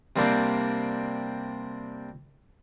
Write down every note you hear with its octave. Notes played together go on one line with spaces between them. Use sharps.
C3 G3 A#3 C4 D4 C6